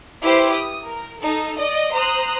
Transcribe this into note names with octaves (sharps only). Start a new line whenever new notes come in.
E4 G4 B4 C5
D#6
A#4
D#4 A4
D5 D#5
C5 A#5 D#6 F#6